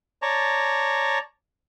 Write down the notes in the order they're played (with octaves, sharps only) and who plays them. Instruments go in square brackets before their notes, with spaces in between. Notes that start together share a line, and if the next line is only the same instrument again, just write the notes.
[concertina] C#5 D5 A5 A#5